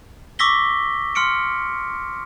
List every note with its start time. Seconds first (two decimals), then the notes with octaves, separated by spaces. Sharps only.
0.39 C#6 D6 E6 A#6 B6 G7
1.15 C6 F6 C#7 D7